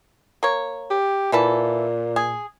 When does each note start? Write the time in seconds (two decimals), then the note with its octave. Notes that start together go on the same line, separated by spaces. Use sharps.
0.43 A#3 C#5
0.90 G4
1.32 A#2 E3 E4 A4
2.16 G#4